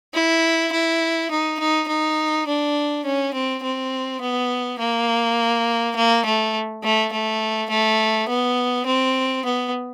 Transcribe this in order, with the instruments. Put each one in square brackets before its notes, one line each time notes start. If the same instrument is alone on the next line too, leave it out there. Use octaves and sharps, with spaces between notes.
[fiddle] E4
E4
D#4
D#4
D#4
D4
C#4
C4
C4
B3
A#3
A#3
A3
A3
A3
A3
B3
C4
B3